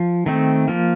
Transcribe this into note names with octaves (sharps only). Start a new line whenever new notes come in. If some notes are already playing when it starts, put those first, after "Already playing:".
Already playing: F3
D#3 A3 C4
F3 A#3